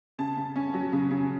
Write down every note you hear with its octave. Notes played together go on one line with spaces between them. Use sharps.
C#3 A5
C#3
C#4
F#3
C#3
C#3